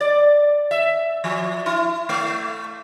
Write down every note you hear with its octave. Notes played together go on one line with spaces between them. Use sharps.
D5
E5
F3
E4
A3